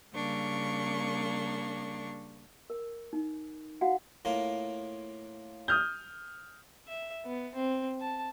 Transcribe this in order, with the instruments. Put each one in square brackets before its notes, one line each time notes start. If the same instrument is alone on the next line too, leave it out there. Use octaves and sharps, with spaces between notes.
[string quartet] C#3 G3 A#3 D4 C#6
[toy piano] A#4
D#4
F#4 F5 F#5
[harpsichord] A2 A#3 F4
[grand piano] D#6 F6 G6
[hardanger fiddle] E5
B3
C4
A5